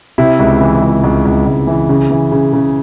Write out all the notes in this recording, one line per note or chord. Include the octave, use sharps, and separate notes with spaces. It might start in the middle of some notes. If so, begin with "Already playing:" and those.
C3 E4
C#2
E3
C#2
C#2
C#2
C#2
E3
C#3
E3
C#3
C#3